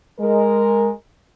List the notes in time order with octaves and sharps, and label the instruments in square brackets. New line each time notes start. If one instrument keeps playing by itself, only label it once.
[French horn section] G#3 A#4